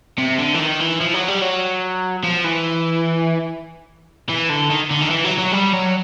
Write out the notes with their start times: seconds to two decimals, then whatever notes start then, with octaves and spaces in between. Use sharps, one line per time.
0.18 C3
0.39 D3
0.55 E3
0.60 D#3
0.80 E3
1.01 F3
1.14 F#3
1.28 G3
1.42 F#3
2.24 F3
2.45 E3
4.29 E3
4.50 D3
4.70 D#3
4.91 D3
5.01 D#3
5.11 E3
5.25 F#3
5.38 F#3
5.52 G3
5.73 F#3